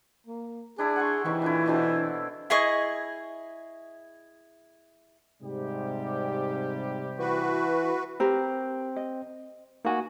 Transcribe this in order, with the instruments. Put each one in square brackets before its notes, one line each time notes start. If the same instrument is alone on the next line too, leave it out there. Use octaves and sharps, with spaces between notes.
[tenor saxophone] A#3
[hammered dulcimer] D4 E4 D5 [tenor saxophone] G#4
[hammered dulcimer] F#5 C6 C#6
[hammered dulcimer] C3 D#3 C#6 [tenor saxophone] E3
[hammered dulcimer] A#2 D3 E4
B2 D3 C4
[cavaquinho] E4 G#4 D#5 C#6
[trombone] G#2 [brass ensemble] C3 G3 G4
[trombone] E3 [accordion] F#4 B4
[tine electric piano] C4 [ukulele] G4 A#4 B4
[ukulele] D#5
[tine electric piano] A#3 F#4 [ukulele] D#4 G#5